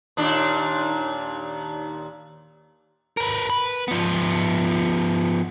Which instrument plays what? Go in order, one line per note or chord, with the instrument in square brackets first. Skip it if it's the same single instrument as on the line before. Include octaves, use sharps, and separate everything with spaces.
[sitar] D#2 A#2 D4
[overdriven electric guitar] A#4 B4
B4
F3 B3